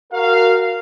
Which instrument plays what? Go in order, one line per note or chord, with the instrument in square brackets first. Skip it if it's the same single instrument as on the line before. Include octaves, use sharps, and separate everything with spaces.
[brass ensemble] F#4 A#4 F5